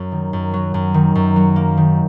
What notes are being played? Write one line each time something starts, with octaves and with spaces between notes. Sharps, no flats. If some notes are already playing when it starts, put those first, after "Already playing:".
Already playing: F#2 F#3
D#3
F#2
F#3
F#2
D#3
F#2
F#3
A#3
D#3